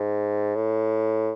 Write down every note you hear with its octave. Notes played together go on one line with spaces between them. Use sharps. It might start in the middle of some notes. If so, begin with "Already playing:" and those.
Already playing: G#2
A2